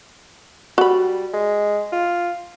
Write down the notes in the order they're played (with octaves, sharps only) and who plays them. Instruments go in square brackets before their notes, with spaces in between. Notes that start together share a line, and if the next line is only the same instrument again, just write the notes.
[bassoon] G3 [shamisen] F#4 B5
[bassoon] G#3
F4